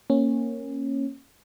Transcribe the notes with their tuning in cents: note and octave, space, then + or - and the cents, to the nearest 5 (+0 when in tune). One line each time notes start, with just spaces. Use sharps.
A#3 +0 C#4 -15